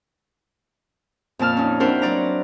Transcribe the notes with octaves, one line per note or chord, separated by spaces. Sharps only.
F2 A#2 A5 F6
C#4 D#4
C4 D4 E4 F#4 A#4 C5
F#3 F#4 D5 A#5